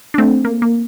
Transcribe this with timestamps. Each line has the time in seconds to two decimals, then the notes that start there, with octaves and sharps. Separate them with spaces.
0.14 D4
0.18 A3 C4
0.45 A#3
0.62 A#3